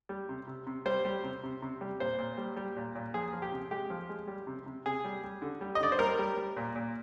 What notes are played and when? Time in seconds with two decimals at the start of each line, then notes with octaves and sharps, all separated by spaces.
0.09 G3
0.29 C3
0.47 C3
0.67 C3
0.85 G3 C5
1.05 G3
1.24 C3
1.43 C3
1.62 C3
1.81 G3
2.00 A#2 C5
2.18 A#2
2.37 G3
2.57 G3
2.77 A#2
2.95 A#2
3.14 F3 G#4
3.33 F3
3.42 G4
3.52 C3
3.71 G#3 G4
3.90 F3
4.09 G#3
4.28 G3
4.47 C3
4.66 C3
4.86 C3 G#4
5.04 G3
5.24 G3
5.42 D3
5.61 G3
5.75 D#5
5.80 D3 D5
5.92 C5
5.99 G3 A#4
6.19 G3
6.37 G3
6.57 A#2
6.76 A#2